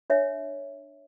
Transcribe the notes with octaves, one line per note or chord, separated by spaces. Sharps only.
D4 C#5 E5